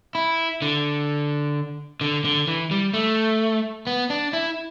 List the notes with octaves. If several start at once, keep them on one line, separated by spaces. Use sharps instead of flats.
E4
D3
D3
D3
E3
G3
A3
B3
D4
E4